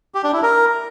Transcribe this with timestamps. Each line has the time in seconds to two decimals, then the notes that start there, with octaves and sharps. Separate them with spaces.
0.15 G4
0.24 D4
0.33 E4
0.43 A#4